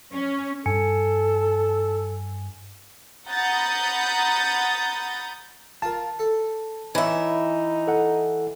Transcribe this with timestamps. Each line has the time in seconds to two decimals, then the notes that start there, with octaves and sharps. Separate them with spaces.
0.12 C#4
0.66 G2 A4 G#5 C#7
3.30 F#5 A#5 B5 D#6 G6 A6
5.82 F4 A#4 A5
6.19 A4
6.95 E3 D#4 C#5 E5
7.88 A4 F#5